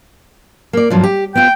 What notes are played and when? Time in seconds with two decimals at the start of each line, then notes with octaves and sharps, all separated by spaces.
0.73 A#3 D5
0.90 G2 F3 F#3
1.04 G4
1.35 B3 F4 G5